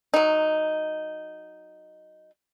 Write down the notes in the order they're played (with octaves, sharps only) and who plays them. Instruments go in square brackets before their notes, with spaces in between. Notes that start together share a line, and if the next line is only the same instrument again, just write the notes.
[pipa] F#3 D#4